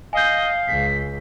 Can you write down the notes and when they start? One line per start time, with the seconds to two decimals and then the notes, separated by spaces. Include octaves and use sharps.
0.13 D#5 F5 G#5 G6
0.68 C#2 B6